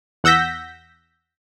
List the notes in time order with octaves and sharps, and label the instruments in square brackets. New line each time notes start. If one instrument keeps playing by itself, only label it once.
[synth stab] E2 F#5 E6 G6 A#6 B6